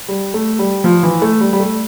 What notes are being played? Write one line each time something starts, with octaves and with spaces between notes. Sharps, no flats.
G3
A3
G3
F3
E3
A3
G3
G3
A3